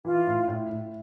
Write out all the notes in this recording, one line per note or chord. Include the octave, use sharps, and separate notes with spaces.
E3 F4
A2
A2
A2